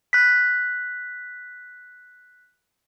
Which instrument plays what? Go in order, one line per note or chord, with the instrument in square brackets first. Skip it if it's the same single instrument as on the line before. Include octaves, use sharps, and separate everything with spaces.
[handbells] F#6 B6